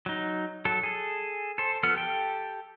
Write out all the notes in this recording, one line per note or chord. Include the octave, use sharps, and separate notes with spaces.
F#3 D#4
F#3 A4
G#4 A4
A4 C5
F3 B3 A4 F#5 F6
G4 A4 G5